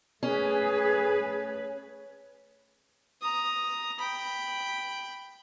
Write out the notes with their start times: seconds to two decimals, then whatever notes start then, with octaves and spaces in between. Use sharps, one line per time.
0.23 A3 C#4 G#4 B4
3.22 A#5 D#6
4.00 G5 B5